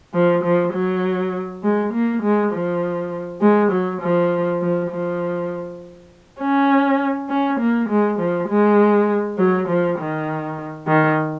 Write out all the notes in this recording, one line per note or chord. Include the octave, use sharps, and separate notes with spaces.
F3
F3
F#3
G#3
A#3
G#3
F3
G#3
F#3
F3
F3
F3
C#4
C#4
A#3
G#3
F3
G#3
F#3
F3
D#3
D#3